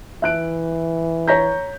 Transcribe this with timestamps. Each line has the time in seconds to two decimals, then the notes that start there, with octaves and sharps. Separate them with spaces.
0.22 E3 E5 F#6 D7
1.28 C#5 A#5 G6 A#6 B6